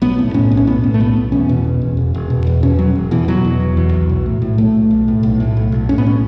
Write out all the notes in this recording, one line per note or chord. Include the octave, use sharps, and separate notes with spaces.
B1 B3
A2
A2 C#4
B1
C#4
A2 B3
A2
A3
B1 B3
B1
E2 C#4
B2
E1
E1
E1
E1
B2
E2
B2 C#4
E1 F#3
E1
B2 E3
B2 F#3
E2
E1
E2
B1
B1
A2
A2
B1 A3
B1
B1
A2
B1
A2
B1
B1
A2 C#4
B3
C#4